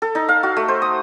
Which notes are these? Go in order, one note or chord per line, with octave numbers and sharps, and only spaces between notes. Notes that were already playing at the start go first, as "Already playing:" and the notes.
A4
D#4
F5
F#4
A3
C5
D#6